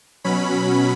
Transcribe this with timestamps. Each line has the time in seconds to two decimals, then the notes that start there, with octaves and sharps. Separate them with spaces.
0.24 B2 F#3 C#4 B5
0.53 B5